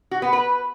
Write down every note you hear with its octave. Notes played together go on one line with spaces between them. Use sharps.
F#4
B3
B4